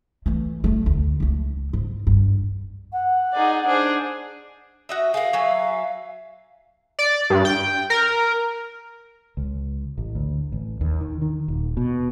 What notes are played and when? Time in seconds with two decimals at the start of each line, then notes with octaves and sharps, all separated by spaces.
0.26 E3 A3
0.64 F2 A3
0.86 D2
1.20 C#2 A3
1.73 G#2
2.07 G2
2.93 F#5
3.33 D#4 G#4 D5
3.66 D4 G#4 C5
4.89 F#4 D#5 E5
5.14 G#4 A#4 F5
5.33 F#3 E5 G#5
6.99 D5
7.30 G2
7.45 G5
7.90 A#4
9.37 C#2
9.98 A1
10.15 D2
10.52 A1
10.81 D#2
11.01 D#3
11.22 D#3
11.48 D#1
11.77 B2